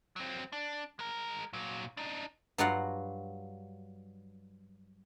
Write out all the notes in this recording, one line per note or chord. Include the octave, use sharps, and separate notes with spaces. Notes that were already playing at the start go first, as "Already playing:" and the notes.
F#3 C4
D4
G#3 A#4
A#2 F#3
D4 D#4
G2 F#3 F4 F#4 F5 F#5